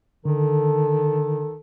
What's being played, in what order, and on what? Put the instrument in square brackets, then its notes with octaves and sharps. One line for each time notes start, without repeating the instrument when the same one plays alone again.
[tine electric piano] D3 [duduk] D#3 [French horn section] A4